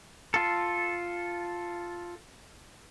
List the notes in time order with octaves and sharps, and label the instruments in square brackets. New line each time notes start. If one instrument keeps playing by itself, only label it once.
[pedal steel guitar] F4 A4